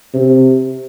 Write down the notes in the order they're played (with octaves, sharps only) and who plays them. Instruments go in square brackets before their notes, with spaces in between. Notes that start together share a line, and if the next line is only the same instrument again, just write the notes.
[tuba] C3